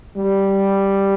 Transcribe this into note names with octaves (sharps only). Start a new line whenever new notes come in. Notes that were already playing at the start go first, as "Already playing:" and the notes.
G3